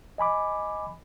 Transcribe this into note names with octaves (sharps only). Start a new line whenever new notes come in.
D#5 G#5 B5 D6